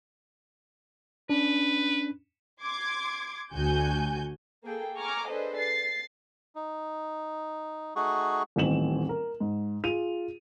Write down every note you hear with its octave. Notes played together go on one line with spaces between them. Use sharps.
C#4 D4 B4
C6 D6 G#6
D2 F#4 G#5 G6
A#3 G#4 A4 G5
G#5 A#5 C#6 D6 F6
D4 G#4 A4 B4 C5 D#5
A6 C7
D#4
A3 D#4 F#4 G#4 F#5 C#6
D#1 A1 C4 E7 F#7
A#4
G#2
F4 G#4 D#7 F7